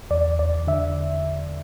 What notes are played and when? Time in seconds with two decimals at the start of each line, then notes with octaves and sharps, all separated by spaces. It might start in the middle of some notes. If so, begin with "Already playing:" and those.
0.11 E2 D5
0.39 E2 D5
0.67 D3 E5